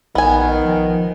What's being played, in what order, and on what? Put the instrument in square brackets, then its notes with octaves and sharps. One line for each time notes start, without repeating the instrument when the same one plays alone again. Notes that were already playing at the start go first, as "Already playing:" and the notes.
[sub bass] A#1 [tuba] D#3 [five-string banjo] B3 G#5
[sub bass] F3